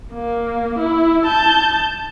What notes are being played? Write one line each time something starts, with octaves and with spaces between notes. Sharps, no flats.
A#3
E4
A5 G6